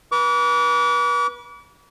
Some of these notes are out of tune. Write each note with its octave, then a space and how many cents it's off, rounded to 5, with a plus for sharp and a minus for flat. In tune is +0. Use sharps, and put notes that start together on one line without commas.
B4 -35 D6 -40